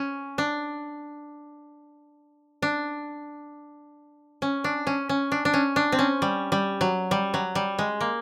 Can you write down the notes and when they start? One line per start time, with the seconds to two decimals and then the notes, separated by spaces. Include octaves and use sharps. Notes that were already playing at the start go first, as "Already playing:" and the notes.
Already playing: C#4
0.38 D4
2.62 D4
4.42 C#4
4.64 D4
4.87 C#4
5.09 C#4
5.32 D4
5.45 D4
5.54 C#4
5.76 D4
5.92 C4
5.99 C#4
6.22 G3
6.52 G3
6.81 F#3
7.11 G3
7.34 F#3
7.55 G3
7.79 G#3
8.01 A#3